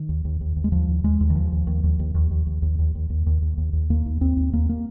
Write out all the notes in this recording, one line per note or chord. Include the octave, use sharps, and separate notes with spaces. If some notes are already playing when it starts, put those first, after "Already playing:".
Already playing: D#3
D#2
D#2
D#2
D#2
G#3
D#2 F3
D#2
D#2 G#3
D#2
D#3
D#2 F3
D#2
D#2
D#2
D#2
D#2
D#2
D#2
D#2
D#2
D#2
D#2
D#2
D#2
D#2
D#2
D#2 A#3
D#2
D#2 C4
D#2
D#2 A#3
A#3